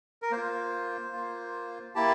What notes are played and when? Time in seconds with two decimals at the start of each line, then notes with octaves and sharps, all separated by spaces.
0.22 A#4
0.31 A#3 F4 C5
1.13 A#3 F4
1.95 A#3 E4 G4 A5